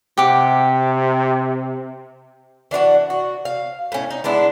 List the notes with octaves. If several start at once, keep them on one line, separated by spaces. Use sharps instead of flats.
C3 G4 F#5 D6
E3 D4 F4 F#4
F#4
F5
A2 C#4
D#4
G#3 B3 D4 E4